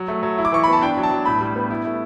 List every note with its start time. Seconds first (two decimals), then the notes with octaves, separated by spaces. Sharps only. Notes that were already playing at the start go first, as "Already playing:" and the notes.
Already playing: F#3
0.08 A3
0.23 F#3
0.38 E4
0.45 D6
0.52 E3 C#6
0.63 B3 B5
0.73 A5
0.81 D4 G5
0.97 F#3
1.03 A5
1.11 F#3
1.25 A2 B5
1.41 G3
1.56 B3
1.70 E4
1.85 A3